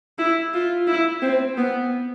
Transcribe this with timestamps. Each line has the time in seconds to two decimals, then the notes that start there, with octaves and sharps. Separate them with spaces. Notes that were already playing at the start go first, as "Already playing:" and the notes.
0.19 E4
0.54 F4
0.87 E4
1.22 C4
1.57 B3